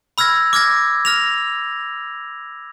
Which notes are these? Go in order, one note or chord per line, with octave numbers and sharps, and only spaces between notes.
B5 E6 F6 G#6 A#6
D6 F6 G#6 A#6
F6 A#6 F7